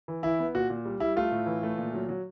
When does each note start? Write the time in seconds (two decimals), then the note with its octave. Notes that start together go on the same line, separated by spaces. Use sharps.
0.08 E3
0.23 E3 E4
0.39 B3
0.55 A#2 F#4
0.70 A#2
0.85 G3
1.00 G3 E4
1.16 A3 F4
1.32 A2
1.46 E3
1.63 A3
1.78 A#2
1.94 F#3
2.09 F#3